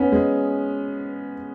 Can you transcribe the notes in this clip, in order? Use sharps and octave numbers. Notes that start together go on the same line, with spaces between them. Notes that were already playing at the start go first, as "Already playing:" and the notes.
Already playing: B3 C#4
G#3